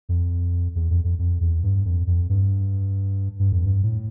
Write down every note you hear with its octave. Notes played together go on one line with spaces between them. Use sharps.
F2
E2
F2
F2
F2
E2
G2
F2
F2
G2
G2
F2
G2
A2